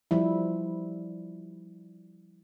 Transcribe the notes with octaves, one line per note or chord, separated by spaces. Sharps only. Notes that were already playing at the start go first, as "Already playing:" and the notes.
F3 G3 E4